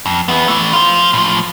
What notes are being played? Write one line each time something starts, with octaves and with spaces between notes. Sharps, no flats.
F2
B3 E4
E3 A3
F4 C5
A2 F3